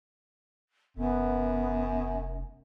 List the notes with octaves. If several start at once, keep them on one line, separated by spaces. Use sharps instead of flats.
F1 F#2 B3